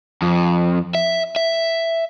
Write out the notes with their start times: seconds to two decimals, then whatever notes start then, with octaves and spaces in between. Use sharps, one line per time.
0.22 F2
0.95 E5
1.36 E5